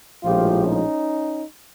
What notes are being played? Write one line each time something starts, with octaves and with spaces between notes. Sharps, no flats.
A#1 A2 F3 G#3 F4 G4
C#4 D#4